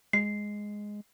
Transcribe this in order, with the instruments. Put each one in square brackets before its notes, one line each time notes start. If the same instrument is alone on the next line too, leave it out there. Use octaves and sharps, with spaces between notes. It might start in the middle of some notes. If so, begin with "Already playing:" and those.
[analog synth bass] G#3 [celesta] C7